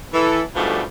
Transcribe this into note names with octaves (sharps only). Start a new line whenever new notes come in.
E3 A4
G#2 B2 D3 F3 G3 A3